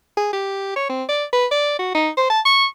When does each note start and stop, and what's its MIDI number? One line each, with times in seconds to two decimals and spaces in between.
0.17 0.29 68
0.33 0.72 67
0.76 0.88 73
0.89 1.04 60
1.09 1.24 74
1.33 1.46 71
1.51 1.75 74
1.79 1.90 66
1.95 2.09 63
2.17 2.29 72
2.30 2.40 81
2.45 2.65 85